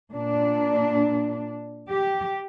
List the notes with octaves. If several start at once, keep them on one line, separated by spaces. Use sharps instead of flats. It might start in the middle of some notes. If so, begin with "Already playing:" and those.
A#2 D4
G4